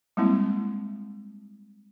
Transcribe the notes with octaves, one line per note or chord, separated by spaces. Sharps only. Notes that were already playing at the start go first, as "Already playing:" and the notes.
G3 G#3 A#3 C4 E4